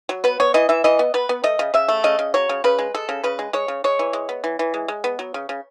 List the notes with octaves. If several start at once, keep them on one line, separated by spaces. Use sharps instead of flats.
F#3
B3 B4
B3 C#5
E3 D#5
E3 E5
E3 D#5
B3
B3 B4
B3
A3 D#5
C#3
C#3 E5
A3
C#3 D#5
C#3
F#3 C#5
C#3
C#3 B4
G#3
G#3 A4
C#3
C#3 B4
G#3
G#3 C#5
C#3
G#3 C#5
E3
G#3
B3
E3
E3
G#3
G#3
B3
F#3
C#3
C#3